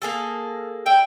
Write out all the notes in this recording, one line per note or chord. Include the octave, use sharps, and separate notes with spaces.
A#3 G#4 A4
E4 G5